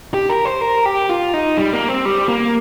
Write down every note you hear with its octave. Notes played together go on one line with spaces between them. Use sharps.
G4
A#4
C5
A#4
G4
F4
D#4
G3
A#3
C4
G3
A#3